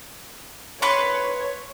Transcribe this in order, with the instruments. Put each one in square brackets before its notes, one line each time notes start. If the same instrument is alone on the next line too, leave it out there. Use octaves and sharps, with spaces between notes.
[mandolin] B4 C6 C#6 [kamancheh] C#5